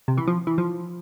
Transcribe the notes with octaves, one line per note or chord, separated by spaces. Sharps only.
C3
E3
F3
E3
F3